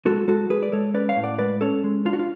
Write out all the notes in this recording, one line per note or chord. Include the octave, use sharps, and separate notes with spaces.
G#3 F#4 A4
G#3 F#4 A4
G#3 G#4 B4
D5
G#3 A4 C#5
C#4 B4 D5
C#5 F5
A2
D5 F#5
G#3 B4 D5
C#4 A4 C#5
G#3
D4 F4
F#4
F4